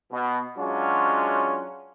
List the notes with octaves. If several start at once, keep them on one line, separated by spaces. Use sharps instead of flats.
B2
F#3 G#3 C#4 D4 F4 F#4